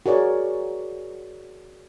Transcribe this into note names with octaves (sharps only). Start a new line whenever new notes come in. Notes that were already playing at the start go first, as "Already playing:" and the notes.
F#4 G#4 A#4 C#5 D5